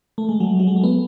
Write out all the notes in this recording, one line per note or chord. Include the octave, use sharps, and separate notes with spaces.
A3
G#3
F#3
F#3
G#3
A3
B3